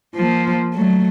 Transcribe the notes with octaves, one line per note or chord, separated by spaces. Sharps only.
F3 A#3
F#3 A3